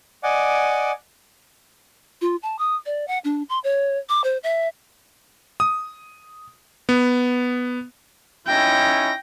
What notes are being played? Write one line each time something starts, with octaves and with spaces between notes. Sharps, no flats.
D5 D#5 F#5 G#5 D6
F4
A5
D#6
D5
F#5
D4
C6
C#5
D6
C5
E5
D#6
B3
C#4 D#4 E4 G5 A#6